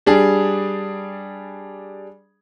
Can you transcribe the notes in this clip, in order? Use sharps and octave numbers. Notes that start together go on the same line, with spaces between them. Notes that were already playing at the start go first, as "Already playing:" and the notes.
G3 D4 G#4